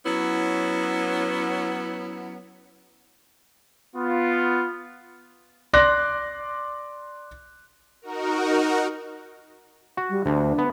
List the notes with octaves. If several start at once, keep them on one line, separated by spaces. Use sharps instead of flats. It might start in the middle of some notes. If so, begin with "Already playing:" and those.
F#3 B3 C#4 E4
B3 F4
D5 C6 D6 F#6 A#6
D#4 F#4 A#4
F#4
G3
D2 D4
B3